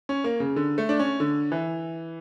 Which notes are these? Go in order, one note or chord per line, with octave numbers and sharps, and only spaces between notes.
C#4
A#3
C#3
D3
A3
D4
C#4
D3
E3